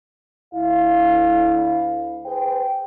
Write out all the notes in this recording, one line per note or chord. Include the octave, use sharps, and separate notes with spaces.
D2 E4 F5
G#4 B4 C5 G5